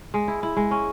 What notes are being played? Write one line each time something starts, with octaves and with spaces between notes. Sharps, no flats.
G#3
E4
E4
G#3
C#4